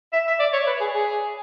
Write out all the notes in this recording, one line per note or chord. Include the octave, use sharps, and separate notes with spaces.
E5
E5
D5
C#5
B4
G#4
G#4